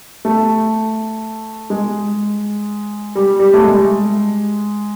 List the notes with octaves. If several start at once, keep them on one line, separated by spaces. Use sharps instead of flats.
A3
G#3
G3
G3
A3
G#3